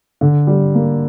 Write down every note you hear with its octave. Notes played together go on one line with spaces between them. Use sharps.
D3
G3
A#3